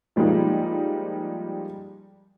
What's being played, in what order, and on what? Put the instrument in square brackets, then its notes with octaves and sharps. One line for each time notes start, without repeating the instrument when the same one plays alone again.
[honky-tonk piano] F3 G3 G#3 A#3 D#4